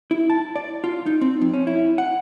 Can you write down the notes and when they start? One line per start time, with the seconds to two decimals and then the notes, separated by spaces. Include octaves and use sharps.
0.11 E4
0.30 A5
0.56 D5
0.84 F4
1.06 D#4
1.21 C4
1.41 F2
1.53 C#4
1.67 E4
1.98 F#5